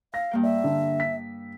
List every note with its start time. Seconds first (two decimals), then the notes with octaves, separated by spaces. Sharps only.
0.14 F5 A#6
0.31 G2 A#3 G5
0.44 D5 E5
0.64 D3
1.00 B6